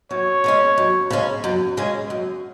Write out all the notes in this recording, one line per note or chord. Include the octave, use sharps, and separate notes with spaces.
F#2 C#5
C#3 G#3 C#4
F#2
C#3 G#3 C#4
F#2
C#3 G#3 C#4
F#2